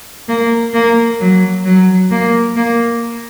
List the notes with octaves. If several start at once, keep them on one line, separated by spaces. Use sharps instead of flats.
A#3
A#3
F#3
F#3
A#3
A#3